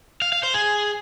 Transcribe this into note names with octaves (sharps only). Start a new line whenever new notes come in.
F5
F5
C5
G#4